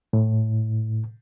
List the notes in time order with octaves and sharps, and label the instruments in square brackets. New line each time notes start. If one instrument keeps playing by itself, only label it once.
[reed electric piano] A2